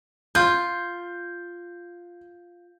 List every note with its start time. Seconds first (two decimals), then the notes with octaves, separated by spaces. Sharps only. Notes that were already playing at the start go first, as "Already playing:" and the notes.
0.35 F4 G6